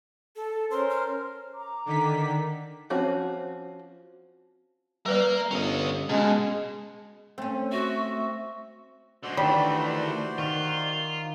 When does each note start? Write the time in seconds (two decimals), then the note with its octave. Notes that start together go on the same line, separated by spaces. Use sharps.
0.36 A4
0.71 C#4 A#4 C5 C6
0.90 F6
1.54 A#5 D6
1.86 D3 D#3 B6
2.90 F3 C4 C#4 F#4
5.06 G3 A#4 B4 D5 F5
5.51 G1 C#4 D#5
6.09 B2 G#3 C#4
7.38 A3 C4 C#4
7.72 F#4 E5
9.23 D3 G#3 F#4 C5 D5
9.37 D2 D#3 E3 G3 A3 D4
10.38 D#3 F4